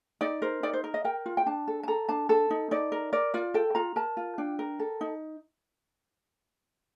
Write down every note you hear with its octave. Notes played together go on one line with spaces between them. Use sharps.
D#4 D5
A#4 C5
D#4 D5
C5
A#4
D#5
A#4 G5
F4
G5
D4 A5
A4
A5
A4 A#5
D4 A5
A4 A5
D#4
D#4 D5
A#4
A#4 D5
F4 D5
A4 G5
F4 A#5
A#4 A5
F4
D4 G5
A#4
A4
D#4